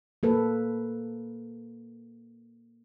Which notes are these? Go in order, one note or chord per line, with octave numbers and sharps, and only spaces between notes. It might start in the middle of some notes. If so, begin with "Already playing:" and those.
A#3 A4 B4